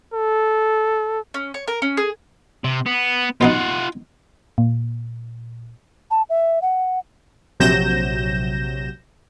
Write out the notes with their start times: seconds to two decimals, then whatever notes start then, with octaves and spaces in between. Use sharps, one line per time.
0.14 A4
1.34 C#4
1.54 C#5
1.68 A#4
1.82 C#4
1.97 G#4
2.64 C3
2.86 B3
3.41 B2 B3 D#4 F4 F#5
4.58 A#2
6.11 A5
6.30 E5
6.62 F#5
7.60 A#1 C3 F#3 G6 A#6 E7